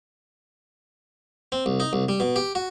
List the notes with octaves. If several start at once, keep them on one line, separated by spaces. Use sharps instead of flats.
C4
C2
D#4
C2
G3
B2
G4
F#4